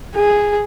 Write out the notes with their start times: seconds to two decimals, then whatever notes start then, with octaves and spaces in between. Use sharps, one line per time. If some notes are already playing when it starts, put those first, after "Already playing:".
0.15 G#4